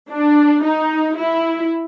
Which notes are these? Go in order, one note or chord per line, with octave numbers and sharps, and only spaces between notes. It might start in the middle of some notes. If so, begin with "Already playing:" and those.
D4
D#4
E4